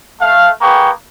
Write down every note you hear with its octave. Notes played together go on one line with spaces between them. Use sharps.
A3 F5
A#3 G#4 B4 G5 C#6